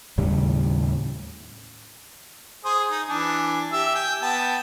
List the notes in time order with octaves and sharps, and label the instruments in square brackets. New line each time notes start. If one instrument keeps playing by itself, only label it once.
[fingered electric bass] D#2 A2 C#3 G3
[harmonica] G#4 C5 D#6
D#4
E3 D4 G#5
G4 E5 E6
G5 G#5
B3 G5 A5